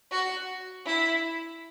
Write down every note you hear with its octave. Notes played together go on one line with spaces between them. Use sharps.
F#4
E4